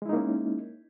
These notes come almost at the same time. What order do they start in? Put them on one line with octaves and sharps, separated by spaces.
G#3 E4 D#4 A#3 C#4